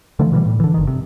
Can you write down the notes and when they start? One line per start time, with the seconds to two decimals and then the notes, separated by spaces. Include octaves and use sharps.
0.19 D3 E3 F3 A3
0.32 B2 E3 F#3 G3
0.46 A2
0.60 D3 E3
0.74 G1 D#3
0.87 C3